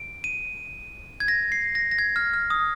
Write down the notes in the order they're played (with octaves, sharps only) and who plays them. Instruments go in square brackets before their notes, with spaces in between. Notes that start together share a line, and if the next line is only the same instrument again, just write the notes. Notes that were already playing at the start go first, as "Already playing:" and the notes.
Already playing: [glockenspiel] D7
D#7
G#6
A#6
C7
A#6
A#6
G#6
F6
F6
D#6